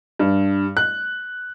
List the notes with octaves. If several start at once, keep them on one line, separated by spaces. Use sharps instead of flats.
G2
F#6